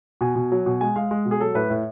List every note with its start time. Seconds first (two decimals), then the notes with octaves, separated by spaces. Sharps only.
0.21 B2 G#5
0.36 B2
0.52 F#3
0.66 B2
0.81 G#3 G#5
0.96 G#3 F5
1.11 G#3
1.25 B2
1.31 G#4
1.40 F#3 A4
1.55 A2 B4
1.70 A2